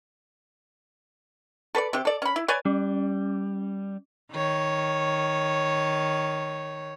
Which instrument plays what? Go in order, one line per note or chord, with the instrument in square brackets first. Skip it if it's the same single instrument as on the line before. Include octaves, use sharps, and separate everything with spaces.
[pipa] A4 B4 C#5 D5
C3 G4
A4 D5
C#4 B5
E4
B4 C#5 D5 G#5
[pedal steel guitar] G3 [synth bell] C#4
[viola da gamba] D#3 C#5